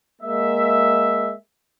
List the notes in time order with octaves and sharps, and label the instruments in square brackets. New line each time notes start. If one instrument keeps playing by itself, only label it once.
[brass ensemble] G#3 A#3 E5